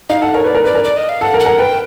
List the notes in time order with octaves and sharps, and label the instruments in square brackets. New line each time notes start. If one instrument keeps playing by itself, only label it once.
[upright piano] D#4 [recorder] F5
[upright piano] A4 [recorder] F#5
[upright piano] A#4 [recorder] C#5
[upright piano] B4 [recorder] D5
[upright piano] A#4
[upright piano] B4 [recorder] D5
[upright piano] A#4
[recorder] D5
D#5
F5
[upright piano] A4 [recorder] F#5
[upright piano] A#4
[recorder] F#5
[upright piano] A#4
[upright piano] B4 [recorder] G5